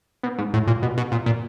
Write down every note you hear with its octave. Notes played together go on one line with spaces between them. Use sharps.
B2
G#2
A2
A#2
B2
B2
A#2
A#2